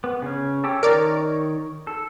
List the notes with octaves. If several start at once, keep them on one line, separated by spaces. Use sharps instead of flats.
B3
C#3 C#4
C#4 G4 A4
D#3 A#4 C#5 D5
A4